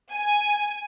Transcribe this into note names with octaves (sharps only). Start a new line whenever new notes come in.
G#5